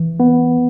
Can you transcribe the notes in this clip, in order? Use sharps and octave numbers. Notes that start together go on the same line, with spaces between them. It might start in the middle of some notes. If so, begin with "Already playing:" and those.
Already playing: E3
B3